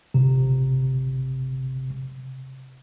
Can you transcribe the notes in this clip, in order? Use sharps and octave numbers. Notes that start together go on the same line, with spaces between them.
G1 C3